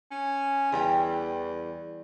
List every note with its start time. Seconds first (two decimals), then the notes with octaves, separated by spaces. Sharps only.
0.11 C#4
0.72 E2 E3 G3 G5